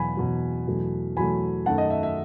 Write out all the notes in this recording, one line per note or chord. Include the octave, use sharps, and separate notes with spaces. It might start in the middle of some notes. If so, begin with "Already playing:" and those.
Already playing: E2 B2 F#3 G#5 B5
E2 B2 F#3
E2 B2 F#3 A3
E2 B2 F#3 A3 G#5 B5
F#2 D#3 F#3 A3 F#5 A5
D#5
E5
E5